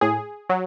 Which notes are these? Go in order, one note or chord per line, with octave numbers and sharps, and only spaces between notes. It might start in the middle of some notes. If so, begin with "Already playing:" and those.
A2 G#4
F#3